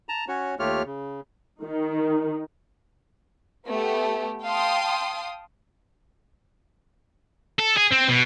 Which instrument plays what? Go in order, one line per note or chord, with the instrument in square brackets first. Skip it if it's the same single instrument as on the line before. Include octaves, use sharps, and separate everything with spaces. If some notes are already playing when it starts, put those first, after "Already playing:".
[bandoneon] A5 A#5
C#4 F#4 C#5
D#2 A3 F4 G4 C#5 F6
C#3
[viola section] D#3 D#4
[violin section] A3 B3 G4
F5 G5 A5 C6 D#6
[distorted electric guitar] A4
G#4
C4
B2